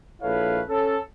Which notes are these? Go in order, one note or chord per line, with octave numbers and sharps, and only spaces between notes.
A#1 E4 A4 B4 C#5 F5
C#4 A4